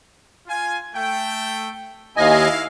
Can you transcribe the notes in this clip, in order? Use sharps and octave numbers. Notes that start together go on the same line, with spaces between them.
F4 G#5
A3 G5
D#2 E4 D#5 F5 G#5